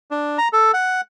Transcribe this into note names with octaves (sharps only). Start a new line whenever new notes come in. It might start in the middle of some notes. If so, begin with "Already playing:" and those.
D4
A#5
A4
F#5